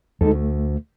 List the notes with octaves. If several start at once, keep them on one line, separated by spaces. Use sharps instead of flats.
D2 G#3 D#4 A4
A3